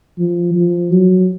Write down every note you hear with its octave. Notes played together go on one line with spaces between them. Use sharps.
F3
F3
F#3